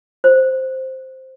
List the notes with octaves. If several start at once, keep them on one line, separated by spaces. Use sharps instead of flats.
C5